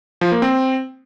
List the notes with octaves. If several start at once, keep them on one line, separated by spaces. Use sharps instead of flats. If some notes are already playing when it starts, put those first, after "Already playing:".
F3
A#3
C4